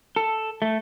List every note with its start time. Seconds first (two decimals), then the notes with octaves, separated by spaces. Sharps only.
0.16 A4
0.62 A3